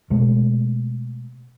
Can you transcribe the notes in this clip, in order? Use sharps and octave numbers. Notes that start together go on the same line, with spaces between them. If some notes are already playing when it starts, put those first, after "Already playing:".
B2 G#3 A3